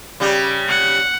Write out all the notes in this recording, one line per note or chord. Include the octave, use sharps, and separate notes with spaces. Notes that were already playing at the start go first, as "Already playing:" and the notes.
C#3 G3
F#5